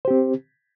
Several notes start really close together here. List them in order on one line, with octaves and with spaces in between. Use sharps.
C5 G4 C4